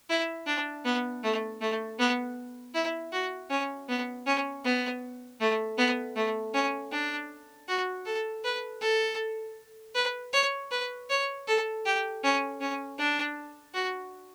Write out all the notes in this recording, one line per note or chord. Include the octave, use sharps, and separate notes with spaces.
E4
D4
B3
A3
A3
B3
E4
F#4
C#4
B3
C#4
B3
A3
B3
A3
C#4
D4
F#4
A4
B4
A4
B4
C#5
B4
C#5
A4
G4
C#4
C#4
D4
F#4